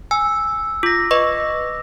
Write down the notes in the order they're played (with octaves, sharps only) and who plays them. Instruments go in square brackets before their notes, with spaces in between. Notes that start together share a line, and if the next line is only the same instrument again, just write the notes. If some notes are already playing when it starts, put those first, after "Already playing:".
[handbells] G#5 [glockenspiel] E6
[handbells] F4 [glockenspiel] D6 A#6
[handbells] B4 D#5 C#6